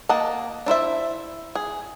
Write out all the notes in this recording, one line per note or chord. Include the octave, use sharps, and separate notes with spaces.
A#3 D#5 F#5 A5
D4 E4 C5 E5
G#4